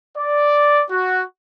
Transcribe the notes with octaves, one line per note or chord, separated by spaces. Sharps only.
D5
F#4